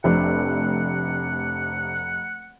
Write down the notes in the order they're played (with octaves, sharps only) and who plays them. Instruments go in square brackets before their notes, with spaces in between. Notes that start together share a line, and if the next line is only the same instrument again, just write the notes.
[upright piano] F1 [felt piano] C3 A3 D4 [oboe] F#5